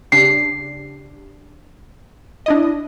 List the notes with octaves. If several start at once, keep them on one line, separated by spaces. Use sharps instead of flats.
C#3 D4 G4 C7
D4 E4 D#5